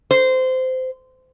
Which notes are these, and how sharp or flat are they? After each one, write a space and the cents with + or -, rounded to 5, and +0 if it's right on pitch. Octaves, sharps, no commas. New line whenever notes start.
C5 -20